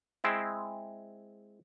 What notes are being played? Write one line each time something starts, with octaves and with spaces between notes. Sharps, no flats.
G#3 C4 E4